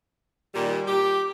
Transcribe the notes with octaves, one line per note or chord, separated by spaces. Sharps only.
A#2 D#3 G3
G4